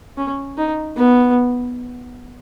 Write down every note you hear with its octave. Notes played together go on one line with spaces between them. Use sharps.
C#4
D#4
B3